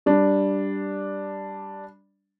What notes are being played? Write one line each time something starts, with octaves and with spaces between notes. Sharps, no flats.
G3 D4